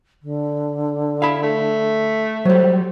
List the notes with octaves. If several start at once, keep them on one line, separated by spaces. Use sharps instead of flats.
D3
E4 F5 B5
A3
F#3 G3 C5